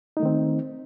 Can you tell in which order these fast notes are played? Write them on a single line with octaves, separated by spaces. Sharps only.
D#4 A3 D#3 C4